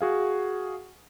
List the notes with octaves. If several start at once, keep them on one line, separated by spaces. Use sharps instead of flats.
F#4 G#4 F5